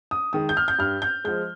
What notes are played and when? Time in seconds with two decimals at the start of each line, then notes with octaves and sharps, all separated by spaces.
0.11 D#6
0.33 D#3 G#3 D#6
0.49 G6
0.57 F6
0.68 G6
0.79 G2 F6
1.02 G6
1.24 F3 G#3 G6